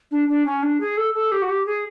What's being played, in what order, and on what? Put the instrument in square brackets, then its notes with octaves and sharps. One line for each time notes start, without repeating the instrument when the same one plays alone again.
[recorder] D4
D4
C#4
D4
G#4
A4
A4
G4
F#4
G4
G#4